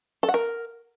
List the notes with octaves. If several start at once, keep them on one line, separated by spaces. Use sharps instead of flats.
A4
F#5
A#4